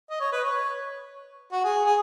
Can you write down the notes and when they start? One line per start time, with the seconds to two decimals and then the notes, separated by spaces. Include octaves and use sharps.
0.10 D#5
0.20 C#5
0.32 B4
0.44 C#5
1.52 F#4
1.64 G#4
1.86 G#4